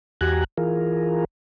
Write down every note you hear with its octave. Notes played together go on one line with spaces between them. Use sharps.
E2 F#4 G4 G#5 A#5 F#6
E3 F4 G#4 A#4